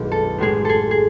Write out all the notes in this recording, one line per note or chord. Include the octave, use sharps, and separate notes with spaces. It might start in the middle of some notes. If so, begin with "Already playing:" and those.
Already playing: F#1 B1 B2 D#3 G#3
A4
A1 A2 G#3 G#4
G#4 A4
G#4